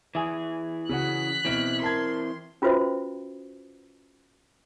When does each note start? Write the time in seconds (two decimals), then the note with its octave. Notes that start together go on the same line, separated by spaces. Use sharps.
0.15 E3 G#4 E5 G#5
0.89 C#3 C#4 F#4 F#6 B6
1.45 B2 E3 C4 E4 F6 D7
1.82 A#4 A5 C6 G#6
2.62 C#4 F4 F#4 B4 C5 E5